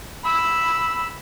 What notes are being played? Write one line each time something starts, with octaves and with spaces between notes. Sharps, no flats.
B5 E6